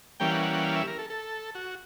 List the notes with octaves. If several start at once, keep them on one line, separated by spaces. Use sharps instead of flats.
E3 G3 A#3 C#4 G5
F5
F#5
F#5
F#5
F5
E5
A#4
A4
A4
F#4